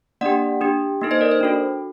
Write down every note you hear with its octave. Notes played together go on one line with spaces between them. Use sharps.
A#3 D4 G4 D5 F#5
D4 G4
A#3 D#4 A4
C5 D#5
A#4 D5
C5
D4 F#4 A4